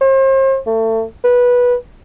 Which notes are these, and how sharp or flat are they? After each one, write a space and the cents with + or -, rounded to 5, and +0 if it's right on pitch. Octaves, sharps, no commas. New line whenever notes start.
C5 +40
A3 +30
B4 -15